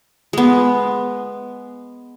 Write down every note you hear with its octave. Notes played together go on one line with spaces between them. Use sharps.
G#3 B3